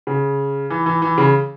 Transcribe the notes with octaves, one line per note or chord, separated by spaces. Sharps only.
C#3
E3
E3
E3
C#3